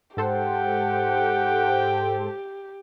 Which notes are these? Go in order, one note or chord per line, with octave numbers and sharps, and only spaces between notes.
G#2 G4 A4 C5 F#5 G5